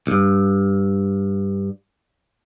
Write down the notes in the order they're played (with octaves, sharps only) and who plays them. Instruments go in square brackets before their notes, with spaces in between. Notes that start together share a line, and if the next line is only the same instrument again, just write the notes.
[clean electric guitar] C2 G2